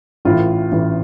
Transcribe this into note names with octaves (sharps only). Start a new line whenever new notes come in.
A1 A2 E3 F4
A1 A2 E3